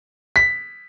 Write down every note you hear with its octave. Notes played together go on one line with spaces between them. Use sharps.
B6